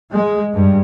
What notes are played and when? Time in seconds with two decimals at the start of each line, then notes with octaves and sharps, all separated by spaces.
0.12 G#3
0.53 G2